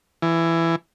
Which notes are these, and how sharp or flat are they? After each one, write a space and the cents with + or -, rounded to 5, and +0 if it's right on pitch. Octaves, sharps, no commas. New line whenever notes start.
E3 +15